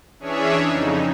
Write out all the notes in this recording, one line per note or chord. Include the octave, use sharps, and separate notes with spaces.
E3 C#4 D4 G#4 C#5 E5
F2 C#3 D#4